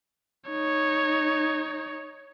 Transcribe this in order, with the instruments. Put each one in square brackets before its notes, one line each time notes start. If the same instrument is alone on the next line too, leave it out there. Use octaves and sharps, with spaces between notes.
[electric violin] D#4 C#5